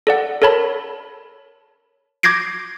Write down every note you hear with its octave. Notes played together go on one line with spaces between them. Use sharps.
A4 D5 F#5
A4 A#4 C#5 A5 B5 B6
D6 G6 G#6 A#6 C7 D7